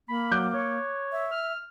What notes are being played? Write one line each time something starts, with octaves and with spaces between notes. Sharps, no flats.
A#3 B5
F#3 D6 F#6 G6
C#5
E5
F6